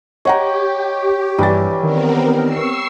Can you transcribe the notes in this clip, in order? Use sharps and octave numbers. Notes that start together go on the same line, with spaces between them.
G4 C#5 D#5 F#5 G5 A#5
A#1 G2 E3 G3 A6
D#3 B3 C4 A#4
C#6 E6 C7